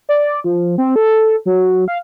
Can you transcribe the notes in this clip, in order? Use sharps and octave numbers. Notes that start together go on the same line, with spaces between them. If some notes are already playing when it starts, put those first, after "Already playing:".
D5
F3
C4
A4
F#3
F5